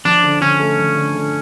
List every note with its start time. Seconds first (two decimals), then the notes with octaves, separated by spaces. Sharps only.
0.05 F3 D4
0.23 D3
0.41 D3 C#4
0.60 A3
0.78 F3
0.96 D3
1.15 D3